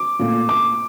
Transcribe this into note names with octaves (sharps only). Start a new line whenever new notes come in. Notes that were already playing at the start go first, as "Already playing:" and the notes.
Already playing: D6
A#2 A3 C4
D6